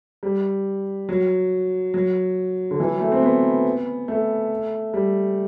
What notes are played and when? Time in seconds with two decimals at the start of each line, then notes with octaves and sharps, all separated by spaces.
0.23 G3
1.09 F#3
1.94 F#3
2.71 D3
2.80 E3
2.91 F#3
3.00 A3
3.12 C4
3.22 B3
4.08 A3
4.94 G3